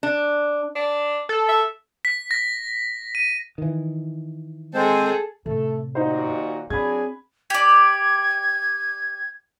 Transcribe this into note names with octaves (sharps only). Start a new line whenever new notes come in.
D4
D4
A4
E5
B6
A#6
D#7
D#3 E3
G#3 C4 G#4 A4 C5
A2 C3 A3 A4
D#2 A#2 D#4 F#4 C5
F#3 C4 D4 G#4 B5 G#6
G4 D5 G#6